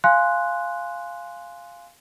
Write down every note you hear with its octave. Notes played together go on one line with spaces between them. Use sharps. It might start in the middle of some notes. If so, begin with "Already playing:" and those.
F5 G#5 C6 F#6